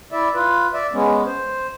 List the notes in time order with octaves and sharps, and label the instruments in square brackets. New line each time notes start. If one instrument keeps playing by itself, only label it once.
[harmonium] E4 D5 E5
F4 B4
D5 E5
G#3 B3 C#4
C5